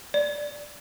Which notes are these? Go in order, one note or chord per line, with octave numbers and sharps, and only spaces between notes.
D5